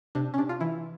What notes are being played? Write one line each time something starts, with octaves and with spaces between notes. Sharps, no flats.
C3 D4
C#4
C3 D4
F4
E3 E4